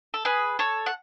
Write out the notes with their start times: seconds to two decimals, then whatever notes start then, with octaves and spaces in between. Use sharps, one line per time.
0.14 A4
0.25 G#4 B4
0.59 A4 C#5
0.86 F#5